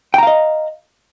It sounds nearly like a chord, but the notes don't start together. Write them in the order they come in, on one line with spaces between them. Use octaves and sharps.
G5 A#5 F5 D#5